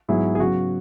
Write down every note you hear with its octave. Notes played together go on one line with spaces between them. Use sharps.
G#2 F#3 B3 E4 G#4
G#4
C#3 F#3 B3 F#4